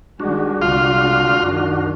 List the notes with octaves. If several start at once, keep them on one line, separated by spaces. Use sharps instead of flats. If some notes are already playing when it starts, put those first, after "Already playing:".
D#3 G3 G#3 D4 F#4
C2 D3 G#3 F4
F#2 D#3